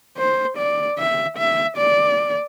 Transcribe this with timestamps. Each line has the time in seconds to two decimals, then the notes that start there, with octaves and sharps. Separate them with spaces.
0.18 C5
0.58 D5
0.99 E5
1.38 E5
1.78 D5